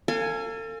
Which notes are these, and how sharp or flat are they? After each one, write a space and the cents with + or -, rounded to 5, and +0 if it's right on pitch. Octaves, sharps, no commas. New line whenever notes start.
A4 +40 F5 +0 G#5 +0